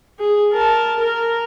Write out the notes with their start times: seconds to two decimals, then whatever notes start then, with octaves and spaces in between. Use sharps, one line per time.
0.19 G#4
0.52 A#4 A5
1.00 A#4